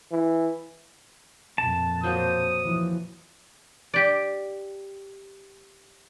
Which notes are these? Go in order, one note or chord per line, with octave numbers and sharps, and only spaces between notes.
E3
F2 A#2 A5
F#3 A#3 C5 D#6
E3 F3
G4 D5